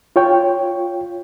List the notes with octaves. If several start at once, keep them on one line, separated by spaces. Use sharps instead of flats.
F4 C#5 G5